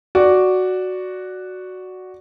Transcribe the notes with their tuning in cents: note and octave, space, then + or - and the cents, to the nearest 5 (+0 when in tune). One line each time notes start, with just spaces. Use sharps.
F#4 +0 D5 +0